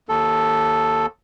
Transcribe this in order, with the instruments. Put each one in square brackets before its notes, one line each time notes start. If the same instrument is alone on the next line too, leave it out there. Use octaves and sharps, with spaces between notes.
[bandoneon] D#2 A4